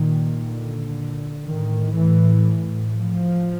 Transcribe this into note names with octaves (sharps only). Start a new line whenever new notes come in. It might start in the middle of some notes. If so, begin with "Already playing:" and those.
Already playing: A#2 D#3
D3
A2 D#3
E3
F3